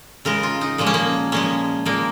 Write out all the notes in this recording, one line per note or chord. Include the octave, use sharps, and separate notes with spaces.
C#3 G#3 A#4
F4
D#4
A#2 F3 G#3 A#3
C#4
A#3
A#2 F3 G#3 C#4
A#2 G#3 A#3